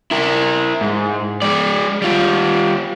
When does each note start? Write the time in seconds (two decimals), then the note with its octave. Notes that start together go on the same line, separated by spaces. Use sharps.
0.11 E4 A#4
0.81 G#2
1.42 G#3 D5
2.02 G3 F4